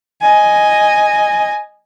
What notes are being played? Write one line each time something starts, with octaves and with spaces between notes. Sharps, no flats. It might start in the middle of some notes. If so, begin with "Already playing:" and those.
D#5 G#5